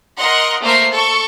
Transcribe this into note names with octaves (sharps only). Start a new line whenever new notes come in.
A#4 D#5 F#5 C6
A3 A#3 A#4 C5 E5 C7
A4 C#6